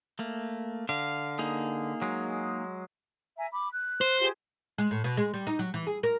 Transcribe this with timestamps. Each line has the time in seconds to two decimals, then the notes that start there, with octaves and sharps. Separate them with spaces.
0.19 A3 A#3
0.89 D3 F5
1.39 A#3 D#4 G#4
2.02 F#3 G#3
3.38 E5 G#5 A#5
3.52 B5 D6
3.71 F#6
4.01 C5
4.20 F4 G4 G#4
4.78 G#3
4.91 A2
5.04 B2
5.17 G#3
5.34 G3
5.47 D#4
5.59 F#3
5.74 E3
5.87 G#4
6.03 A#4